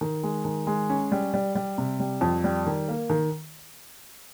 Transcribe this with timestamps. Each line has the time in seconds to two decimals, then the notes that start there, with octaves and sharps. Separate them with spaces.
0.01 D#3
0.23 G#3
0.45 D#3
0.67 G#3
0.90 C#4
1.12 G3
1.34 G3
1.55 G3
1.78 C3
2.00 G3
2.21 F2
2.44 G3
2.66 D#3
2.89 A#3
3.10 D#3